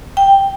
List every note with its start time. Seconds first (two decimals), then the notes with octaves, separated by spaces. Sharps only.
0.17 G5